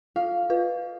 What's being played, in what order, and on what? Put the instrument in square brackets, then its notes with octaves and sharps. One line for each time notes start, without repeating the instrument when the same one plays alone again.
[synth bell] F4 [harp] F5
[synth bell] F4 B4